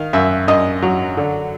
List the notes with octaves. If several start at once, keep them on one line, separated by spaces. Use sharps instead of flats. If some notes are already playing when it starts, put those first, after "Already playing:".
Already playing: D#3 F5
F#2 E5
F#2 D#5
F#3
D3